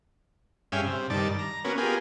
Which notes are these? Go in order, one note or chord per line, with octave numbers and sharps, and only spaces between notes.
G2 C#4 G#4 E5 F5 G5
C3
G2 D#3 D5 A5
A#5
A#3 B3 C#4 F#4
B3 F4 G4 G#4 A#4